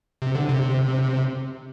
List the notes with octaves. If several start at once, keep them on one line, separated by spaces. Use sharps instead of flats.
C3
D3
C3